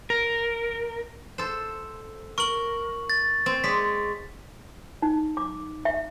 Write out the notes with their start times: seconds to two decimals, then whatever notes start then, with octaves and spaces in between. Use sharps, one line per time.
0.10 A#4
1.38 A4 C5
2.38 A#4 C#6 F#7
3.10 A6
3.46 C4
3.64 G#3 C#5 D5 B6
5.02 D#4
5.37 D6
5.85 E5